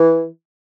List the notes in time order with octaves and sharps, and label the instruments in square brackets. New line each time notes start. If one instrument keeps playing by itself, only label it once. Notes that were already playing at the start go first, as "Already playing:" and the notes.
Already playing: [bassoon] E3